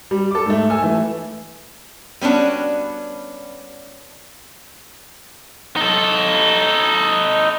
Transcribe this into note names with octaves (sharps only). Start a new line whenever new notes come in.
G3
A4 D6
G#2 A3
A4 G#5 E6
E3 A3
G3 B3 C#4 D4 F#4
D#4 A4